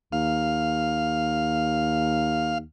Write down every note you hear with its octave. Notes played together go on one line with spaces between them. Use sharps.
D#2 F5